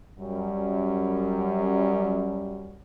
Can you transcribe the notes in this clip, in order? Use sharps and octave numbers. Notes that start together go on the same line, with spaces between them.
F#2 G3